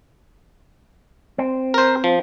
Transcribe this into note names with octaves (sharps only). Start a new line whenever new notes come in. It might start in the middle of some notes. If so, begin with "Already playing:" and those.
C4
A#4 C5
F3